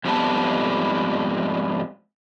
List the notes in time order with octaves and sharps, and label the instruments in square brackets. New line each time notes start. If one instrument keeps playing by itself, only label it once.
[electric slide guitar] F2 G#2 G3 G#3 B3 A5